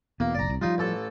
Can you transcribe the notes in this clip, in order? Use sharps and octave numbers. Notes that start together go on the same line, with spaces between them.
E2 B2 A#3
F#1 B1 D5 A#5
C2
F3 G3 D#4 F4
A1 A4